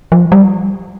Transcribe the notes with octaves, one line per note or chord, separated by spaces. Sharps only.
F3
G3